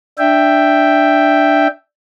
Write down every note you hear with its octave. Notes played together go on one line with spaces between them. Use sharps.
D4 E5 G5